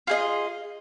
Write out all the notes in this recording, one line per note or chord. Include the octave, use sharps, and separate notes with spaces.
F4 G#4 D#5